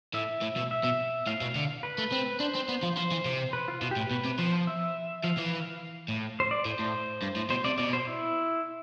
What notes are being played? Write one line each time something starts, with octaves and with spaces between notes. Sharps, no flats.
A2 E5
A2
B2
E5
B2
A2 F5
B2
D3
B4
A3
C4
D4 C5
C4
B3
F3
F3 C5
E3
C3
B4
F4
B2 F4
G4
A2
B4
B2
C3
F3 C5
E5
F3 F5
E3
A2
C5
D5
A2 C5
A2
G2
A2
B2 C5
C3 D5
B2 D5
C5
E4